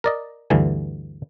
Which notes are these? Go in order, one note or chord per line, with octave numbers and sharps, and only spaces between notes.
A#4 D5 D#5
D2 G2 D3 E3 G#5